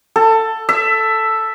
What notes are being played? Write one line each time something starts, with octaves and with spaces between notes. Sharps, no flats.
A4
E5